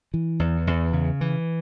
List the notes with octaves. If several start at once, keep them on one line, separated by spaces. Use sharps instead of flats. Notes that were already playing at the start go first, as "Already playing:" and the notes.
E3
E2
E2
C#3
E3